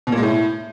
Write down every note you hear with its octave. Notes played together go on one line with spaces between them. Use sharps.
B2
A#2
G#3
A2